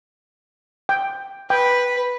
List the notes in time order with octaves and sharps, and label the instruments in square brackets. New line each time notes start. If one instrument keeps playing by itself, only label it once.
[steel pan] G5
[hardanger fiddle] B4 [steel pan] G5